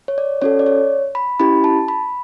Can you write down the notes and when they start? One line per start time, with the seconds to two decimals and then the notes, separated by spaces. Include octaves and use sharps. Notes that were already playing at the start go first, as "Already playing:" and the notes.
0.08 C#5
0.18 D5
0.42 C#4 F#4 A4 C#5
0.59 D5
0.66 C#5
1.15 B5
1.40 C#4 E4 G4 B5
1.64 A5
1.88 B5